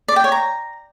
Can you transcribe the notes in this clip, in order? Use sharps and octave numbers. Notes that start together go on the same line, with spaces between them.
D5
G5
C#5
A#5